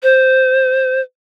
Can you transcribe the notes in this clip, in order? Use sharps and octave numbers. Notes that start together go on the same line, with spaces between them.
C5